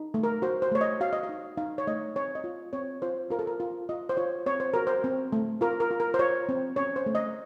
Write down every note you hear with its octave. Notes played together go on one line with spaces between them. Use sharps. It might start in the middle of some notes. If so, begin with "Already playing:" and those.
Already playing: D#4
A3
A#4
F#4 C5
C5
A3 C#5
D#5
F#4 F5
D#5
F5
D#4
D#4 F5
C#5
A3 D#5
C4 C#5
D#5
F4
C4 C#5
F4 C5
F4 A#4
A4
A#4
F4
F4 D#5
C5
F4 C#5
C4 C#5
C5
F#4 A#4
C5
C4
A3
F4 A#4
A#4
F4
A#4
C5
F4 C#5
C4
C#4 C#5
C5
A3
D#5